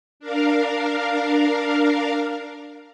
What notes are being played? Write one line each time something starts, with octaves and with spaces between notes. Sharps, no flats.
D4 A#4 F5